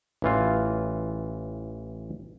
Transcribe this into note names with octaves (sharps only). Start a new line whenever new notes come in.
A1 E3 F4